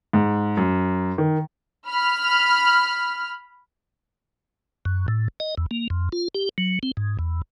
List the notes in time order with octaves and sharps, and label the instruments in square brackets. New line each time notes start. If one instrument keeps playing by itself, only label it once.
[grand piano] G#2
F#2
D#3
[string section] B5 F6
[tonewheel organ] F#2
A2
D#5
E2
A#3
F2
F4
G4
F#3
C4
G#2
E2